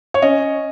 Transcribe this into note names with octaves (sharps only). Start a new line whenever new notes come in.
C#5
C#4 D#5